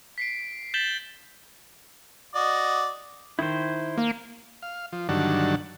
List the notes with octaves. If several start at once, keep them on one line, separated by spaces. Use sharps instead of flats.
B6 C7 D7
G6 A6 B6 E7 F#7 G7
F#4 D5 D#5
D#3 E4 C5
A#3
F5
F3
G2 D3 D#3 F#3 F#5 A5